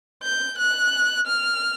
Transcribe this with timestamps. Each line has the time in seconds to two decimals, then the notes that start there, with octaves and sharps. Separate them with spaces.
0.23 G6
0.58 F#6
1.27 F6